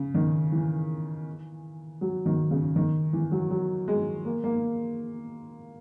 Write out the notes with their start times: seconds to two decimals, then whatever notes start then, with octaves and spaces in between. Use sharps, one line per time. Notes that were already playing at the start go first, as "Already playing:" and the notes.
Already playing: C#3
0.14 D#3
0.52 E3
2.01 F#3
2.26 D#3
2.51 C#3
2.76 D#3
3.13 E3
3.31 F#3
3.50 F#3
3.88 G#3
4.25 A#3
4.44 A#3